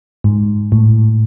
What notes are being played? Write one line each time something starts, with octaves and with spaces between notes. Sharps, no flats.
G#2
A2